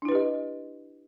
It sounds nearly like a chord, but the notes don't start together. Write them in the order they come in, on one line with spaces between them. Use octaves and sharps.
D4 E4 B4 G4 D#5